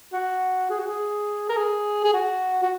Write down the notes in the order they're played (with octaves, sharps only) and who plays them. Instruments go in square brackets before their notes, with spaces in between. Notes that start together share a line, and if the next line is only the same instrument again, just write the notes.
[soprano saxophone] F#4
G#4
F#4
G#4
A#4
G#4
G#4
F#4
F#4